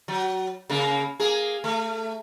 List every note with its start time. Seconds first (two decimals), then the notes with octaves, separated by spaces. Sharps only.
0.08 F#3
0.70 C#3 A#3
1.20 A#3 G#4
1.64 A3